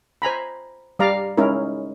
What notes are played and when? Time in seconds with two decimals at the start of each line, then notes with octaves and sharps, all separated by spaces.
0.22 C5 G#5 A#5 B5
0.99 G3 D5 F5 A#5
1.37 G#3 C#4 D#4 E4 A#4